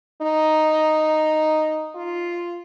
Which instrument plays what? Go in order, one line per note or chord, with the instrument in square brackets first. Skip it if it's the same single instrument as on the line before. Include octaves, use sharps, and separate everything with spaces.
[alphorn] D#4
F4